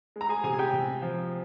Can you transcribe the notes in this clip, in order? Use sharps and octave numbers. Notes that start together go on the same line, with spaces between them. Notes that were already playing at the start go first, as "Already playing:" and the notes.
G#3
A#5
G#4 G#5
C3 G#4 G#5
G#5
G4 G5
C3
F3